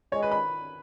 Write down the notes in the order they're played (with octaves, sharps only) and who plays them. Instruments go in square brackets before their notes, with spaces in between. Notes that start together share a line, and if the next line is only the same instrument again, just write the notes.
[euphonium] G#3 [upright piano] C#5
[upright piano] B4
B5